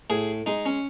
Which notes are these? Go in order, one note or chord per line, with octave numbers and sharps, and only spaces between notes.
A2 G#4
G#3 D#4
C#4